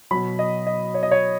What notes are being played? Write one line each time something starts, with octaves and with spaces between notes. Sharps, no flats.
B2 F#3 B5
D#5
D#5
C#5
D#5
C#5